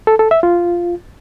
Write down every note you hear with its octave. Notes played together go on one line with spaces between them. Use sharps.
A4
A4
E5
F4